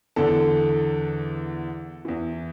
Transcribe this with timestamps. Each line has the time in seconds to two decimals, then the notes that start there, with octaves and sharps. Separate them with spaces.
0.16 E2 D3 A4
2.05 E2 E3